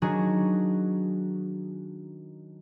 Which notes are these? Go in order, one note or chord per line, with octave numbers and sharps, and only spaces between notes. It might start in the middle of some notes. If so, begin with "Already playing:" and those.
D#3 F#3 D4 F#4 G#4 A#5